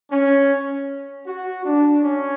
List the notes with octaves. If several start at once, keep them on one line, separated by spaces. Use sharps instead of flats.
C#4
F#4
D4
C#4